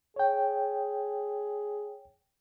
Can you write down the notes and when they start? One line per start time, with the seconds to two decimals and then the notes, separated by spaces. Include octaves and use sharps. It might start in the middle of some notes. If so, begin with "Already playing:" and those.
0.16 G#4 C#5 G5